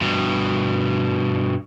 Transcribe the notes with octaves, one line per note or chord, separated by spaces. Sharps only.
G2 B2